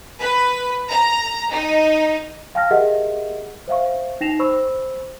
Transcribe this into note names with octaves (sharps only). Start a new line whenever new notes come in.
B4
A#5
D#4
F5 G5 A5 F6 A#6
G4 G#4 A#4 D#5 E5 F#5
C5 E5 F5 C#6
D#4 G5 A#6 C7 E7 F7
C5 B5 C#6 E6